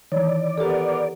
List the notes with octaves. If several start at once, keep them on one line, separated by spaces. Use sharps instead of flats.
D#3 E3 C#5 D5
B3 G4 A4 A#4